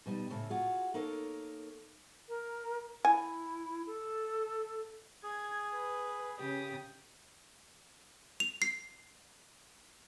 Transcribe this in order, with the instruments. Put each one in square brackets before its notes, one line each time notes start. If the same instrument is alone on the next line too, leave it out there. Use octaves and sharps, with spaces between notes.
[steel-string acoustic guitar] B2 G3 D#4
A2 C#3 A3
F4 F#4 G#4
A#3 D#4 A4 A#4 C#5
[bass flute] A#4
[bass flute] E4 [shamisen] G#5
[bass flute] A4
[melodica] G#4 [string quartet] G#6
[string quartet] B4
C#3 G4 D#6
[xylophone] F7
C7